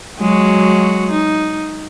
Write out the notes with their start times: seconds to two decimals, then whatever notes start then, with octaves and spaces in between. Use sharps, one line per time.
0.19 F#3 G#3 F#4
1.11 D#4